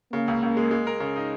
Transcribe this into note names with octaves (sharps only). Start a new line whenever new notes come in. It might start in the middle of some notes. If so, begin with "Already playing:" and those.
C#3 A#3
C#2
C#2
G#3
G#3
A#4
C#3
D#4